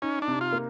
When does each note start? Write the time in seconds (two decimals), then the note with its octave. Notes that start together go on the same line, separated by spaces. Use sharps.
0.02 C#4 D#4
0.22 D4
0.28 C3
0.41 F4
0.52 A#3